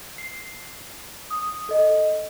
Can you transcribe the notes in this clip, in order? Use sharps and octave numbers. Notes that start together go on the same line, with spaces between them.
C7
D#6
A4 D#5